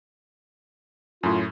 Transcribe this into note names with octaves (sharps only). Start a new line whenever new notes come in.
F#2 A2 F4